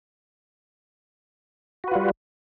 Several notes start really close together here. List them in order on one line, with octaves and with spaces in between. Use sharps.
F#4 B4 F4 G3